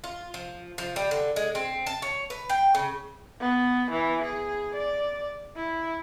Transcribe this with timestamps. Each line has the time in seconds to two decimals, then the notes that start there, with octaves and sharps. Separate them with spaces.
0.04 F4
0.34 F3
0.78 F3
0.96 G3
1.11 D3
1.36 G#3
1.55 C4
1.87 A5
2.02 C#5
2.30 B4
2.49 G5
2.75 C#3
3.40 B3
3.91 E3
4.23 G#4
4.75 D5
5.56 E4